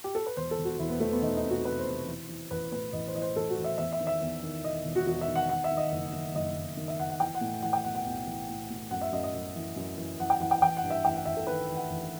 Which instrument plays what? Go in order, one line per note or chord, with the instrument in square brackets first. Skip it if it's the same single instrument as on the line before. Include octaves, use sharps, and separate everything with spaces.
[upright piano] G4
A4
B4
E1 C5
A4
E1
F#4
E1 E4
B3
E2 A3
B3
E1 D#4
D#4
C3
F#4
C3 B4
C5
C3
E3
E3
A1 B4
A2 B4
A1 D#5
C5
E3 D#5
C5
A1 A4
F#4
A1
E5
E2 E5
E5
D#3
E5
E2
D#3
E1 D#5
E1
F#4
E1 F#4
E5
D#3
F#5
D#3 F#5
E5
D#3
D#5
F#1
D#3
F#1 D#5
F#1
D#3
E5
F#1 F#5
F#5
E3 G5
F#5
A2
E3 F#5
G5
B1 F#5
F#5
B1
E3
A2
A2
F#2 F#5
E5
F#2 D#5
D#5
F#2
E3
F#2
E3
E3 F#5
G5
E3 F#5
G5
A1 G5
F#5
G2
E5
A1 G5
F#5
A1 E5
A4
D#3 B4
A1
F#5
A1